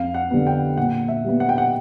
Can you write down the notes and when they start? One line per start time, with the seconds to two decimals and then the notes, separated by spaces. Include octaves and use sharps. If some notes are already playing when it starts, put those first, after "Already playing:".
Already playing: F2 F5
0.14 F#5
0.31 D3 G3 B3
0.47 G5
0.77 A#2 F#5
1.08 E5
1.25 G3 B3
1.40 F#5
1.49 G5
1.58 F#5